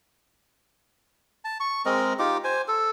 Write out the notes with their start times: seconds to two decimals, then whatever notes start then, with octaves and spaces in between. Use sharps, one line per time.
1.45 A5
1.60 C#6
1.86 G#3 C4 A#4 D#5
2.19 D#4 F4 G4 D6
2.44 C5 G#5
2.68 A4